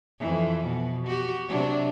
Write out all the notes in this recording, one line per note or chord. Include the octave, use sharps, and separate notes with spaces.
F2 E3
B2
F#4 G4
C3 F#3 D4